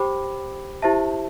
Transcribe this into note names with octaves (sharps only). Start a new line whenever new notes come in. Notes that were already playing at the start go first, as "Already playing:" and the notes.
Already playing: G4 C5 G5 B5 D6
E4 G4 C5 E5 A5